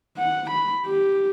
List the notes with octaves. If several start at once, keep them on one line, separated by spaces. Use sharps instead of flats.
F#5
B5
G4